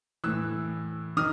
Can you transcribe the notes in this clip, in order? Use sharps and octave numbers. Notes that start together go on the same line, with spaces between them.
A2 E3 E6 F#6
D#3 D#6 F6